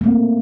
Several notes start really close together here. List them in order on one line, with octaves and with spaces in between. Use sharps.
A3 A#3 C4